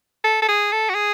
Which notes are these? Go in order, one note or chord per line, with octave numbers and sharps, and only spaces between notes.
A4
A4
G#4
A4
F#4
G#4